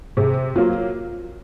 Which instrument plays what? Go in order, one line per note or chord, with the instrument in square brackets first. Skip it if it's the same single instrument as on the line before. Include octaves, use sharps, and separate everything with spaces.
[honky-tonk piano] C3 [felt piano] G#4
[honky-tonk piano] F#3 A#3 [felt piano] F4